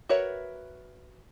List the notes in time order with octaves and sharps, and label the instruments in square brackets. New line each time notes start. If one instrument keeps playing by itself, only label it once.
[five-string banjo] F#4 A#4 B4 C#5 E5